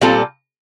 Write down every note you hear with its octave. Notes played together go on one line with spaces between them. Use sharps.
A#2 G3 C4 F4 A4